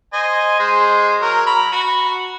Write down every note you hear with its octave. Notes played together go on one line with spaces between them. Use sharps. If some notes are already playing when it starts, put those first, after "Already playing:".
C5 D#5 G#5
G#3 C5
F#3 A#4
A#5 B5
F#4 B5